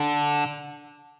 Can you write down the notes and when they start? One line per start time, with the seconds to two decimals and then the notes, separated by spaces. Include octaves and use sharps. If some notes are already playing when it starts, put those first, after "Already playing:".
Already playing: D3